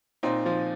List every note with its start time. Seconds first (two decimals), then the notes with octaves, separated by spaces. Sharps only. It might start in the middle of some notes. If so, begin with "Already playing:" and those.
0.23 A#2 C4 D#4
0.46 F3